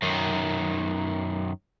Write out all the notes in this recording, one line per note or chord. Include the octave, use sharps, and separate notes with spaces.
F#2 D#3